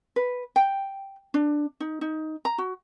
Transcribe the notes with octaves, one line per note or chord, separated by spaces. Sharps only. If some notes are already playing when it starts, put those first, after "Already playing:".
B4
G5
D4
D#4
D#4
A#5
F#4